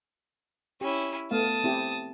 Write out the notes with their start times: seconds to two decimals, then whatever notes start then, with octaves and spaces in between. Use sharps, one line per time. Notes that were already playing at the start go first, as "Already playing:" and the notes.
0.81 C#4 E4 G4
1.31 A3 B3 F5 A5 D#6
1.64 C4 E4 G4